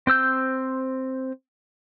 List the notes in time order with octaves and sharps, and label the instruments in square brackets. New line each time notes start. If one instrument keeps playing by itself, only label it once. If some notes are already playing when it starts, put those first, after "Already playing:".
[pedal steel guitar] C4 C5 E6 G6